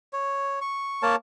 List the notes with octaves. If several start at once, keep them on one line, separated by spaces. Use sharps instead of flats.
C#5
C#6
A#3 A#4 C#5 A5